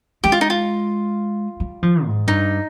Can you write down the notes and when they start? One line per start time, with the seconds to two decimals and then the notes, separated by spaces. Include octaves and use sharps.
0.24 G#3 G4
0.32 F4
0.41 D#4
0.50 F4
1.60 G3
1.83 F3
2.05 G#2
2.27 G2 D#4